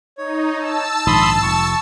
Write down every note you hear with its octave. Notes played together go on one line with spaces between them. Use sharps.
D#4 C#5
A5 E6
A#1 G#2 D#3 B5 C6 D#6
F1 C#6